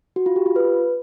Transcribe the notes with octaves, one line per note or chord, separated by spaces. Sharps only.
F#4
F4
G4
F4
B4